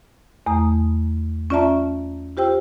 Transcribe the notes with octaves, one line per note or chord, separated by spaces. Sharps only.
E2 A3 A#5 D#6
C#4 F4 D5 E5 A5 A#5
F4 G4 C5 G5 E6